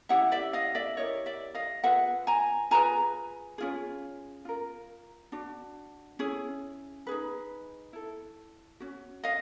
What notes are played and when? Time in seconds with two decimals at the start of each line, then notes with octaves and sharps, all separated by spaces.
0.09 C#4 E4 G4 E5 F#5
0.32 D5 E5
0.53 D#5 F5
0.75 D5 E5
0.97 E4 G4 A#4 C#5 D#5
1.26 D5 E5
1.55 D#5 F5
1.84 F4 G#4 B4 E5 F#5
2.27 G#5 A#5
2.71 F4 G#4 B4 G#5 A#5
3.58 C#4 F4 G#4
4.45 F4 A#4
5.32 D4 F#4
6.19 C#4 E4 G#4
7.07 D#4 G#4 B4
7.93 E4 A4
8.80 C#4 F#4
9.24 D#5 F5